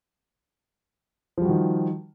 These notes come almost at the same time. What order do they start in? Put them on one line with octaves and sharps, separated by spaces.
F3 G3 F#4 D#3